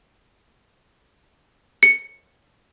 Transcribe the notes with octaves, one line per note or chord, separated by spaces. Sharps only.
C#7